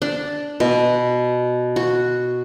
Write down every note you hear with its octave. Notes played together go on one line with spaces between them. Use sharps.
D4
B2
F#4